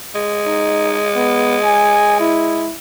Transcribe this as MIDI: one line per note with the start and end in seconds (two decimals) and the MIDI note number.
0.15 2.66 56
0.46 1.03 63
1.16 1.58 59
1.63 2.20 80
2.20 2.75 64